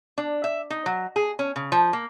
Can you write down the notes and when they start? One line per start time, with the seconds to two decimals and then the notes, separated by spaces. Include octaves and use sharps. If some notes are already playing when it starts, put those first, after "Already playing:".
0.18 D4
0.44 E5
0.70 D#4
0.86 F#3
1.16 G#4
1.39 C#4
1.56 C#3
1.72 F3
1.93 A#3